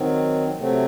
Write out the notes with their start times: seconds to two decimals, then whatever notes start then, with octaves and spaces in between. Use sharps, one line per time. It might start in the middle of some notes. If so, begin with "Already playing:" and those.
Already playing: D#3 F#3 C4
0.57 C3 F#3 A3 C4